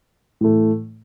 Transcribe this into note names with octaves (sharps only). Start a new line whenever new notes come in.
A2 E3 A3